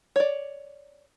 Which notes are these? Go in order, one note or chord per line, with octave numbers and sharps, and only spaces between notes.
C#5 D5